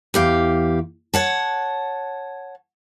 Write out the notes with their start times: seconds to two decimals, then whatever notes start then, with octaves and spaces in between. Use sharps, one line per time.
0.14 E2 G4 F5
1.14 C#5 F#5 A5